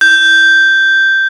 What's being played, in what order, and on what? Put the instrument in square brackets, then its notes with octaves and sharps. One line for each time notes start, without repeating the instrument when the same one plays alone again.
[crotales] G6